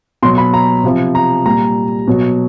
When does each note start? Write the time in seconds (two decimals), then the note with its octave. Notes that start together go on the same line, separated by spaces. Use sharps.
0.22 B2 F#3 C6
0.38 B5
0.54 A#5
0.84 C3 F3
1.15 A#5
1.45 A#2 G3 A#5
2.08 B2 F#3